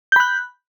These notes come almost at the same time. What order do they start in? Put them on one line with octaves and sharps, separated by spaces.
G6 B5 F#6